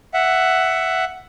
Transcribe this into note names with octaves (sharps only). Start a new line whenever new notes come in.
E5 F#5